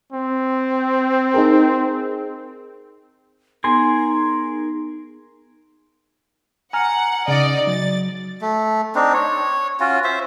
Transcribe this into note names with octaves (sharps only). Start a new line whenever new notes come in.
C4
D#4 G#4 A#4
B3 D#4 G#4 A#4 G#5 C6
F#5 G#5 A#5 F6
C#3 D#4 D5 D#5
F#3 A6
A3
C4 D4 D#4
C#5
C#4 F4 F#4
C5 E5